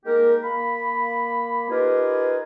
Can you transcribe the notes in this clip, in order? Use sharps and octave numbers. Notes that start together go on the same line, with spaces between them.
G#3 A#3 D#4 G4 A#4
A#3 B5
D#4 F4 G4 G#4 A#4 B4